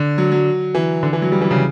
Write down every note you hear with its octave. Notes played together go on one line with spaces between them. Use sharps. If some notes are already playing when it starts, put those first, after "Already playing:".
Already playing: D3
F#3
F#3
E3
D3
E3
F#3
G3
E3
C#3